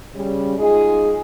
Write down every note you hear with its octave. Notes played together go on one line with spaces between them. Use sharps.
C#3 G3
G#3 D#4 F4 G#4